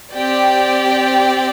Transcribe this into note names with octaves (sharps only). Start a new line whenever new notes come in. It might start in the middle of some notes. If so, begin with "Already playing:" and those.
C4 G4 D5 G5